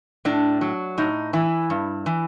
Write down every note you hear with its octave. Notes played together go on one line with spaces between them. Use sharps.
A2 D4
F#3
A2 D#4
E3 E4
G2
E3